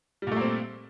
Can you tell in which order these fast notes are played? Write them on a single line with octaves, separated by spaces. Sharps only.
G3 A#2 A3 A#3 C4